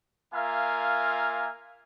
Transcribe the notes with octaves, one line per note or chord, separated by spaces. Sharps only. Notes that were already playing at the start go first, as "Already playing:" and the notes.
A#3 F4 A#4 E5 F5 G#5